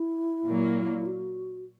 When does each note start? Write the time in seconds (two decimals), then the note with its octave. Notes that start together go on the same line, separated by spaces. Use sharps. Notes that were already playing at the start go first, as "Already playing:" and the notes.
Already playing: E4
0.46 A#2 F#3 A#3
1.07 F#4